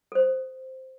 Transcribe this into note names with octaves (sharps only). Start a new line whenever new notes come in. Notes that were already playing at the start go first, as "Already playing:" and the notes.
A4 C5